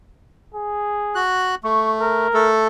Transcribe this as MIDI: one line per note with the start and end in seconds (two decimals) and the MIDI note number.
0.54 1.22 68
1.15 1.55 66
1.15 1.55 90
1.64 2.28 57
1.64 1.90 85
2.01 2.50 70
2.34 2.68 57
2.34 2.68 69